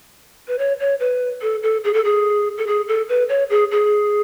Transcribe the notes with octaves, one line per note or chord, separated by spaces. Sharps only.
B4
C#5
C#5
B4
A4
A4
G#4
A4
G#4
A4
G#4
A4
B4
C#5
G#4
G#4